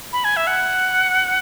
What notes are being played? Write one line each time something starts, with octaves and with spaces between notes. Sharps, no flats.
B5
G#5
E5
F#5